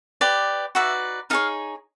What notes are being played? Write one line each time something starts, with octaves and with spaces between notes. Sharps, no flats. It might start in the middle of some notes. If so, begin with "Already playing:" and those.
G4 B4 D5
D#4 F#4 B4 D5 E5
D#4 G#4 C#5 D#5 F5